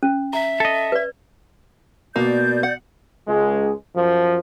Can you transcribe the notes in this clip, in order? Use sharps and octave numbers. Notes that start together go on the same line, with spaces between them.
C#4
E5 A#5
A4 D#5
B4 D5
B2 A#3 D5 G6
F#5
C#2 G#3
F#2 F3